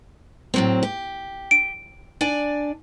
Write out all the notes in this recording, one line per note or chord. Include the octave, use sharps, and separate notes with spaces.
A2 F#3 C4
G4
D7
D4 D5 G#5